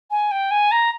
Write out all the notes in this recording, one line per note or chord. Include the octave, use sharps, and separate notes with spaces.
G#5
G5
G#5
A#5